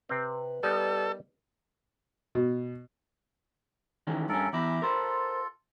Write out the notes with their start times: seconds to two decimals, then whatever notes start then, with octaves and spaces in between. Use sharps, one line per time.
0.09 C3 C4 B4
0.63 G3 B3 D#4 A4 A#4
2.35 B2
4.07 D#3 E3 C#4
4.29 G2 C#4 A4 A#4
4.53 E2 E4 G4 A#5 D6
4.82 F4 A4 A#4 C5